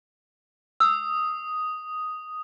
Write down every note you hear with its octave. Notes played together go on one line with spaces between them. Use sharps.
D#6 E6